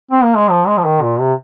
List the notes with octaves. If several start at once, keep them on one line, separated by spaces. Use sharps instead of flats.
C4
A#3
G#3
F3
G#3
F3
D#3
A#2
C3